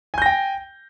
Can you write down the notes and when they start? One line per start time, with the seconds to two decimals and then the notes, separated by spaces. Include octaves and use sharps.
0.14 G#5
0.18 G6
0.22 A#6
0.26 G5